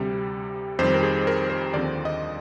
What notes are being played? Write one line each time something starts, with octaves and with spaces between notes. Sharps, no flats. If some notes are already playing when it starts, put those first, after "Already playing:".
Already playing: D2 C3 G3
F2 D#3 G3 C4 C5
A#4
G#4
A#4
C5
D#2 D3 F3 C4 D5
D#5